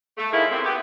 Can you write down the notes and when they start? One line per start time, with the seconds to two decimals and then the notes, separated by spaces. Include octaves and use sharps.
0.18 A3
0.33 A2 D#3 G#3 A#3 E4
0.51 F#2 A2 C3 C4
0.64 B3 G4